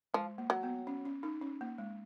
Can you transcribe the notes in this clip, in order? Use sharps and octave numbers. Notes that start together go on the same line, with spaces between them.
F3 G#3
A#3
F#3
B3
C#4
C#4
D#4
C#4
A#3
G#3